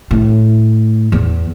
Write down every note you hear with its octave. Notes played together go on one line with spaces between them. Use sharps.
A2
E2